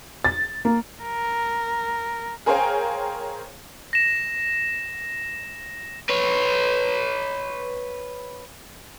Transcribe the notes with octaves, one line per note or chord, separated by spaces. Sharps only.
A6
A#3
A#4
G#4 A#4 C5 C#5 F5 G5
A#6 E7
B4 C#5